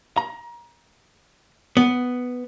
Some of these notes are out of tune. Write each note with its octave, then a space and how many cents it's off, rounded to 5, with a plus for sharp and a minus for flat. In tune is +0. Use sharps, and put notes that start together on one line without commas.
A#5 +25
B3 +5